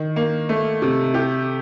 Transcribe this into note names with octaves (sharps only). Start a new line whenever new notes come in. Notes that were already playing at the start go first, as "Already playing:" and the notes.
Already playing: D#3
A#3
A3
C3
G4